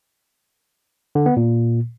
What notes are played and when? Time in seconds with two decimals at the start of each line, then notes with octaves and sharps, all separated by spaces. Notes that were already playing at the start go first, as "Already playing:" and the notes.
1.15 D3
1.26 B3
1.37 A#2